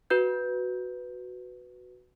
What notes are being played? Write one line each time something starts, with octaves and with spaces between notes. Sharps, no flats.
F#4 B4 G6